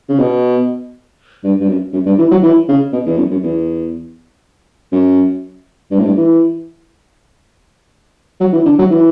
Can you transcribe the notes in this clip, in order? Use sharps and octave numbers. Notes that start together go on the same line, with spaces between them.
C#3
B2
G2
G2
F#2
F#2
G2
E3
F#3
E3
C#3
B2
E2
F#2
F#2
E2
F#2
G2
A2
G2
E3
F#3
E3
D3
F#3
E3